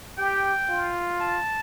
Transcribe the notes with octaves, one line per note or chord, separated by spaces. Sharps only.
G4 G5
F4
A5